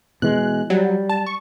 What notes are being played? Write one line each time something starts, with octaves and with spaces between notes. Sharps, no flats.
B2 E3 G#3 F#6
F#3 G3
A5
C#6